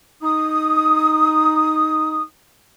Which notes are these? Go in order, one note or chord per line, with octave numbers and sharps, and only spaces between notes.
D#4 D#6